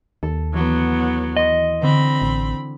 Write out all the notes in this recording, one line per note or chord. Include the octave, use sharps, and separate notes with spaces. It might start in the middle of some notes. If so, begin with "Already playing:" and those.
D#2 A4
E3 F#3 B3
D#5 C6 D#6 C#7
D3 C4 D4 B5
A1